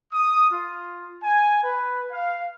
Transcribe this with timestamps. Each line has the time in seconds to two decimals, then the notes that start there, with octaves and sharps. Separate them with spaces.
0.13 D#6
0.50 F4
1.23 G#5
1.62 B4
2.11 F5